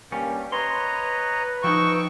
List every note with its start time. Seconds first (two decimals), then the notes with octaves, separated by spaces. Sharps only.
0.12 G2 G3 A#3 C#4
0.52 B4 C#5 D#5 A#5 C6
1.64 F3 D#4 G5 C#6 E6